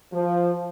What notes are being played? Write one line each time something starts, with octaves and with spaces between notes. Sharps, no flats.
F3